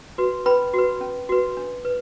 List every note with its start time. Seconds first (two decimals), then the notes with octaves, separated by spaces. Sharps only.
0.18 F#4 B4
0.46 C#4 B4 B5
0.74 F#4
0.79 B4
1.01 C#4
1.29 F#4 B4
1.57 D4
1.85 B4